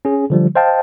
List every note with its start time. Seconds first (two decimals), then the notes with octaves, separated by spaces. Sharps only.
0.05 C#4 G#4
0.30 D3 F3 G3
0.55 C5 D#5 F5 G5 A5